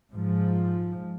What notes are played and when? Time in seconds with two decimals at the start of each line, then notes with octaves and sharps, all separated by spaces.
0.11 G#2 F3